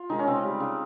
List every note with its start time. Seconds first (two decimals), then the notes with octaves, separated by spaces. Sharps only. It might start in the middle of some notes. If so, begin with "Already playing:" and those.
Already playing: F4
0.09 D#3 G#3 D#4
0.19 C#4
0.27 C#3 C4
0.44 G3
0.60 C#3